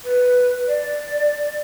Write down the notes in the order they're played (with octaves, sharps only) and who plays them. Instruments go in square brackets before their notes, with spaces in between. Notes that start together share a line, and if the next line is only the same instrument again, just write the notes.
[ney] B4
D5